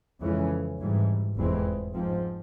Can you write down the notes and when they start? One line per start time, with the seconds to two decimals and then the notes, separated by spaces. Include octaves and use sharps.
0.21 F2 C#3 E3 G#3 C#4
0.78 G#1 G#2 E3 G3
1.36 F1 E2 E3 G#3 C4
1.94 G#2 F3 C4